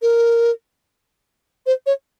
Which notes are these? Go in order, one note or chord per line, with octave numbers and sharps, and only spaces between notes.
A#4
C5
C#5